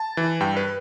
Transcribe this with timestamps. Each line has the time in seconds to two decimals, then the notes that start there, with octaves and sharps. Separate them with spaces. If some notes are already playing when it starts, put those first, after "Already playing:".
Already playing: A5
0.17 E3
0.40 G2 G5
0.57 B4